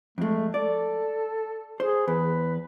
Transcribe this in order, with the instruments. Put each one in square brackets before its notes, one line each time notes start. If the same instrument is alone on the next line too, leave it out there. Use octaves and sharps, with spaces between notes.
[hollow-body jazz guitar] F2 G#3 [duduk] A3
[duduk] A4 [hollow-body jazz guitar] D5
[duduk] G#4 [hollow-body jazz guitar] C5
[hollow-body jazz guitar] E2 [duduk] B4